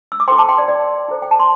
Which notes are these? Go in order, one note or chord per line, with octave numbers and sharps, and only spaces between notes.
E6
D6
E4 A4 C5 G5 C6
A5 D6
G5 C6
D5
D5
E4 A4 C5
G5
A5
C6